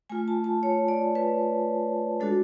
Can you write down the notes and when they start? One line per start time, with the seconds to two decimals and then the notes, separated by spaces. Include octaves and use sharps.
0.09 A3 F4 G#5
0.28 A5
0.44 A5
0.63 C#5
0.88 D5
1.15 B4
2.20 G#3 D4 F#4 A4